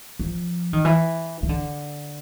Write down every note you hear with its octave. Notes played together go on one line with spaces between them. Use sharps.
F3
D#3
E3
D#3
D3